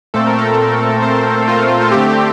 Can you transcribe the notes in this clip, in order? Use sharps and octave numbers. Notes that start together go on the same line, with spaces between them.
A#2 A3 C4 A4
A#4
A4
A#4
C5
F4
F4
D3 A3 C4 G4